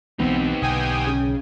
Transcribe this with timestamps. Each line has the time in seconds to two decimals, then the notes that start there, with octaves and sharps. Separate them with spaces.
0.20 B1 E3 G#3 B3 C4 D#4 G4
0.62 B1 D3 G5 G#5 D#6
1.07 C#3